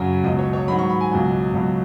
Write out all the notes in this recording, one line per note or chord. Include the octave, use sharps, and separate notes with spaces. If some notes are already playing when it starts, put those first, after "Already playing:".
Already playing: F#2 C#3 F#3
C#2 B2 F#3 D#5
C#5
C#5
G#2 D#3 F#3 B5
C#6
B5
G#5
C#2 B2 F#3
C#2 B2 F#3